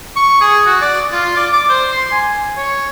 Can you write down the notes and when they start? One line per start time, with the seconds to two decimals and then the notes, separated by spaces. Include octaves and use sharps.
0.16 C#6
0.41 G#4
0.66 F#4
0.82 D5
1.12 F4
1.37 D5
1.53 D6
1.70 C5
1.91 C6
2.12 G#5
2.57 C#5